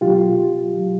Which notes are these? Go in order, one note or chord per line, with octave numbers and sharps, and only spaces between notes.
B2 F#3 F4 G4
B2 F#3